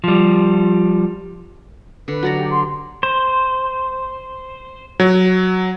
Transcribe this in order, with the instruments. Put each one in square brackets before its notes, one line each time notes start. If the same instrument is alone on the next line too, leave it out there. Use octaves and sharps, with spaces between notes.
[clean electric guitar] F3 G3
[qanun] D3 [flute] B4
[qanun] F#3 D5 A#5
[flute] G4
C6
[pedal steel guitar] C5
[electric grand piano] F#3